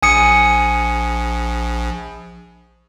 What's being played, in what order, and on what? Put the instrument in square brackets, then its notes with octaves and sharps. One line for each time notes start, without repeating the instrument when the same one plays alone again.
[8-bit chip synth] A#1 [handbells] G#5 D#6 C#7